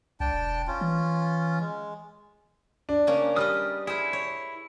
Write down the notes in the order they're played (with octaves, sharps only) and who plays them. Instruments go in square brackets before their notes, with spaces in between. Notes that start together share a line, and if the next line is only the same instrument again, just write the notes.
[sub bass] C2 [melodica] D4 G5 A5
[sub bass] E1
[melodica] C#4 F4
[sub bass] E3
[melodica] G#3
[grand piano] D4
[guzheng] C#3 A#3 C#4
[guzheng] G3 B4 D#5 [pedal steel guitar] D#6 F6
[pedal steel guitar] E4 [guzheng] G#4 C5
[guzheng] C#5